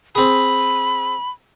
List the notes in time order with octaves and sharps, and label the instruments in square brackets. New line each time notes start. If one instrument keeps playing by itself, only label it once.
[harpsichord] C4 G#4 [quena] B5